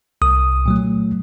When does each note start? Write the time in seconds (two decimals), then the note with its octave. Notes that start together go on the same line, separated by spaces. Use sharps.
0.22 C2 D#6
0.66 A#2 F#3 A3